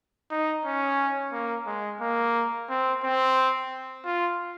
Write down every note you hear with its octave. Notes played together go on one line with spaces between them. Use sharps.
D#4
C#4
A#3
G#3
A#3
C4
C4
F4